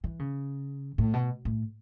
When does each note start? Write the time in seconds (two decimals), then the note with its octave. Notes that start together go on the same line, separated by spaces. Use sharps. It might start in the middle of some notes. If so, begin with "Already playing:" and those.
0.04 E3
0.19 C#3
0.98 A2
1.14 B2
1.45 A2